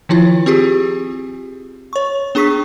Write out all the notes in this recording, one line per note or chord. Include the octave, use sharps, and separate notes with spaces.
D#3 F3 E4 F4
C4 F4 G4 G#4
C#5 C#6
B3 D4 G#4 C#6 B6